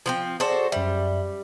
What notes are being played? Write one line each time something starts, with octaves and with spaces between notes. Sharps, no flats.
F3 B3 C4
F#4 G#4 A4 C5 D5
F#2 G3 E5